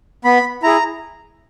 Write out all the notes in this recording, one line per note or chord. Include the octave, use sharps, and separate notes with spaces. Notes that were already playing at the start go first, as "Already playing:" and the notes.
B3 B5
E4 G#4 A#5